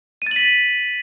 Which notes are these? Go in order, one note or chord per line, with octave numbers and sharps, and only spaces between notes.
A6 B6 D#7 F#7